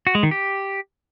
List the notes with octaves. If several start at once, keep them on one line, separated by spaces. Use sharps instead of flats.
F#4
G#3
D#3
G4